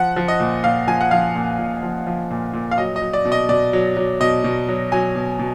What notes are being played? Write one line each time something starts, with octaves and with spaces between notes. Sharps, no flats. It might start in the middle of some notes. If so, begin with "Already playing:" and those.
Already playing: F3 F#5
F3
D#5
A#2
A#2 F5
F3 G#5
F#5
F3 F5
A#2
A#2
F3
F3
A#2
A#2
F5
F#3 D#5
D#5
F#3
D5
B2
D#5
B2 D5
F#3
F#3
B2 D#5
B2
F#3
F#3 G#5
B2
B2